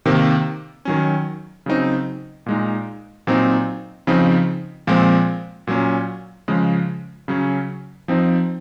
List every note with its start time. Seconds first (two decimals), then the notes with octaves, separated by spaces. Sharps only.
0.06 C3 D#3 A#3
0.85 D#3 F#3 C#4
1.66 C#3 F#3 C4 D#4
2.46 A#2 G#3 D#4
3.27 A#2 F#3 C4 D#4
4.07 C#3 F3 C4 D#4
4.87 A#2 F3 G#3 C4
5.67 A#2 F#3 C#4
6.48 C#3 F3 G#3
7.28 C#3 F#3 C#4
8.08 F3 C4 D#4